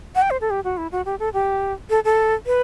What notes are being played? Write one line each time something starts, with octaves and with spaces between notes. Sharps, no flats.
F#5
G5
C5
A4
G4
F#4
E4
F#4
G4
A4
G4
A4
A4
B4